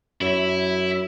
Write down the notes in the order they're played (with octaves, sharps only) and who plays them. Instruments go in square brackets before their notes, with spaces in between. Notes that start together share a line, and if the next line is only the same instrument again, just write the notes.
[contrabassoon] F#2 [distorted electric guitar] E4